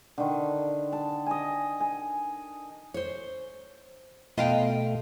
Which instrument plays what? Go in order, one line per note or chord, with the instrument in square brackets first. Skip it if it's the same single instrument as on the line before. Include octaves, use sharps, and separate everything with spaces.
[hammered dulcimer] D3 D#3
A5
D#5 G#5
G#5
[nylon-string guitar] C5 C#5
[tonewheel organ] B2 A3 [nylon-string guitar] B3 D#5 A5 [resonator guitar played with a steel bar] F4 F5 G5